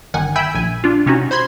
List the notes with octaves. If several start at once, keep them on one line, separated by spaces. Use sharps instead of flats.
G1 D#3 F#5 G#5
E5 G5 G#5 B5 E6 G6
A#1 G#5
D4 F4
C3 C#4 D#4 F#4
C5 B5 C6 G#6